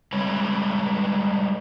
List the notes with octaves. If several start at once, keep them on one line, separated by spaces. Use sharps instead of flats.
G3 G#3 B4 C#5